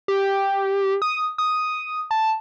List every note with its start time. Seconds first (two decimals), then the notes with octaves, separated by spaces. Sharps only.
0.08 G4
1.02 D#6
1.38 D#6
2.11 A5